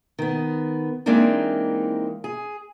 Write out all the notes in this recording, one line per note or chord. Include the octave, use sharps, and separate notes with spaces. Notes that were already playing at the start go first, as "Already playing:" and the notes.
D#3 B3
E3 G#3 A#3 C4 D4 D#4
G#4